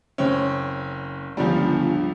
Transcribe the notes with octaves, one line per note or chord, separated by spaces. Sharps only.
F#1 C4 C#4
G1 C#2 F3 G3